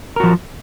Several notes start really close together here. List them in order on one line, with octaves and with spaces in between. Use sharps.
A#4 F#4 F3